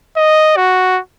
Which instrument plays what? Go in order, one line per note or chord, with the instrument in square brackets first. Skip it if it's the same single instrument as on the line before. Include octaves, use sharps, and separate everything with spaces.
[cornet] D#5
F#4